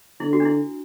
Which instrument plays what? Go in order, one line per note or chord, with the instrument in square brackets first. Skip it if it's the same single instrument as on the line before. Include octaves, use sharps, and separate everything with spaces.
[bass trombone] D3 [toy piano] E4
[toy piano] F#4
D4
E4